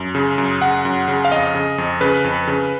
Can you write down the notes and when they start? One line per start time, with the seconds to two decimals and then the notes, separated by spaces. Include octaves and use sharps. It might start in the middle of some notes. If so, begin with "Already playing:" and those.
Already playing: F#2
0.15 C#3
0.38 F#2
0.61 C#3 F#5
0.85 F#2
1.08 C#3
1.25 F5
1.31 F2 D#5
1.55 C#3
1.78 F2
2.01 C#3 B4
2.24 F2
2.48 C#3